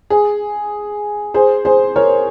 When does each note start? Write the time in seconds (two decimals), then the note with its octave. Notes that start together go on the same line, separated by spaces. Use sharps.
0.10 G#4
1.34 G#4 C5
1.65 G#4 C5
1.96 A#4 C#5